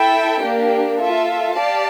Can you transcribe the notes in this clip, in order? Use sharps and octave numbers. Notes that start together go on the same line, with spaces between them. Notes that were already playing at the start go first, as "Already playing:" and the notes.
Already playing: E4 A4 E5 G5
A#3 D4 G4
F4 A4 E5
G4 D5 F5 A5